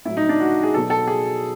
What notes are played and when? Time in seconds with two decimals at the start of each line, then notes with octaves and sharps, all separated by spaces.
0.05 A2 F#3 E4
0.17 D#4
0.29 D4
0.40 F#4
0.63 G#4
0.74 B2 F#3 A4
0.90 A4
1.07 G#4